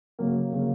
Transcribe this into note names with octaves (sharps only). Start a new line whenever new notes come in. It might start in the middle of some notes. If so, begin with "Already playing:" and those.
C#3 F#3 A#3
C#3 F#3 A#3